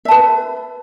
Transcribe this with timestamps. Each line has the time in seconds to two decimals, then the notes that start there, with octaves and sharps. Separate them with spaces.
0.05 E5
0.08 A5
0.11 B4